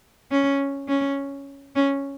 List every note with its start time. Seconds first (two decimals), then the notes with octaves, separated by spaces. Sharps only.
0.31 C#4
0.88 C#4
1.76 C#4